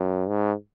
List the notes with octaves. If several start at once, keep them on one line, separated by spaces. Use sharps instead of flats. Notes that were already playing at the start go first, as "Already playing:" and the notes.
Already playing: F#2
G#2